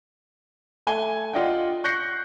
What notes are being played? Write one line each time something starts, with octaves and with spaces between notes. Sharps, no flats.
A3 A4 G#5 G7
F4 D5 D#5 F#5 G5
C#6 F#6 G6 A#6 C7 C#7